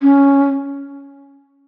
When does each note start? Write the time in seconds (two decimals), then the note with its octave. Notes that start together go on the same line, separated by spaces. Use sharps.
0.02 C#4